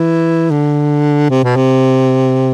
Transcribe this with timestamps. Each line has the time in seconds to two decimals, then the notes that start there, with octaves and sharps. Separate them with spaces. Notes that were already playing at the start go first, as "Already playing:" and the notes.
Already playing: E3
0.50 D3
1.30 C3
1.43 B2
1.56 C3